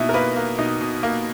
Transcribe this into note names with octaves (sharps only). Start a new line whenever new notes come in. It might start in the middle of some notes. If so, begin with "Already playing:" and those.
Already playing: B2 A#3 D#4 E4
A#4
A#3 B4
A#3
B2 D#4
B2
A#3